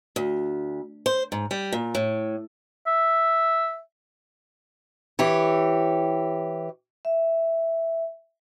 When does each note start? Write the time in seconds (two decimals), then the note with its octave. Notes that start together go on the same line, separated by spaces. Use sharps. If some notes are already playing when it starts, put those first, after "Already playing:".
0.16 D2
1.06 C5
1.32 G#2
1.51 G3
1.72 A#2
1.95 A2
2.87 E5
5.19 E3 G4 C#5
7.05 E5